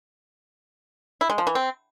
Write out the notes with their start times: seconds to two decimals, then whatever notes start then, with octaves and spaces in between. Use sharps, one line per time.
1.21 E4
1.30 G#3
1.38 F3
1.47 E3
1.55 C4